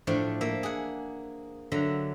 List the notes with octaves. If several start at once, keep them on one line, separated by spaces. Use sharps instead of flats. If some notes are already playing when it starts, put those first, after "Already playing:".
A2 F3 A3 D4
A#3 E5
G#4 F#5
D3 F#3 E5 A#5